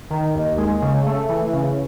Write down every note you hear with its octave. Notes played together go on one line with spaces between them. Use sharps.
D#3
D#2
G#3
C#3
A3
E3
C#3